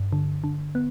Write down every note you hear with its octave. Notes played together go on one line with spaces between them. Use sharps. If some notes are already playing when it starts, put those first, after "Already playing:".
Already playing: G2
D3
D3
B3